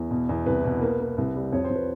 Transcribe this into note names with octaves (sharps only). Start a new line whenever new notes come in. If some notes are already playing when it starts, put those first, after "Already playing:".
Already playing: E2
B2
E2
C2 B4
B2
A#3 B4
A#3
C2
G3
F2 C#5
C5
F2
B4